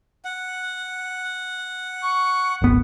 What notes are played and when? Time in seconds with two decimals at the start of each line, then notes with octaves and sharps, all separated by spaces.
0.25 F#5
2.03 C#6
2.62 D1 G#1 B3